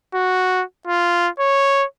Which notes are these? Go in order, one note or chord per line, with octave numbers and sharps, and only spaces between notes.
F#4
F4
C#5